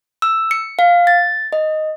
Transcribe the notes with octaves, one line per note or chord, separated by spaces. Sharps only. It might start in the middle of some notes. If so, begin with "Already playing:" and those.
E6
C#7
F5
A6
D#5